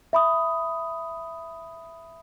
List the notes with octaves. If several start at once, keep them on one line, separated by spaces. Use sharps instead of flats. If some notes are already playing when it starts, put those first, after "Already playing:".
E5 B5 D#6